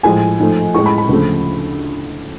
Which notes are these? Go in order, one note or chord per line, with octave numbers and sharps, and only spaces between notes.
A2 F3 G#3 G#5
G#2 F3 A3
A2 G#3 C#6
B5
B5
D2 C#3 F3 A3